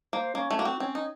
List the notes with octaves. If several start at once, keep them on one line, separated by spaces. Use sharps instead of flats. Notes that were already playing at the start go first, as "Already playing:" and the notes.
A#3 C5
A#3 C#4
A3
A#3 F#4
C4
C4 C#4
D#4